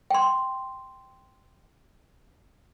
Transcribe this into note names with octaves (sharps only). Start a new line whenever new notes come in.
G5 C6